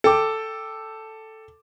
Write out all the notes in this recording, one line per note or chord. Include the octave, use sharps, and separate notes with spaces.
A4 G5 D6